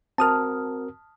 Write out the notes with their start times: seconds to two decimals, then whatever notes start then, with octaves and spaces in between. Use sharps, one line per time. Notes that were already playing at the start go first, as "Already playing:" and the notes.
0.18 C4 F#4 A#4 A5 D#6 F6